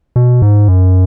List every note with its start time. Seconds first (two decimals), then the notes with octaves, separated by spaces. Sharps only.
0.16 B2
0.42 G#2
0.68 F#2